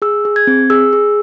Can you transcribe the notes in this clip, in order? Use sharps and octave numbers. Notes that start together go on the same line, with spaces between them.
G#4 E6
G#4
G#6
C4
G#4 E6
G#4